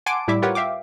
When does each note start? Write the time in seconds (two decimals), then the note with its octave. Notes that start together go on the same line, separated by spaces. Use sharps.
0.06 F#5 G#5 A5 C6 D6 D7
0.28 A2 G3 E4 E5 D6
0.42 F4 G4 A#4 B4 C#5 F#5
0.55 E5 F5 G5 D6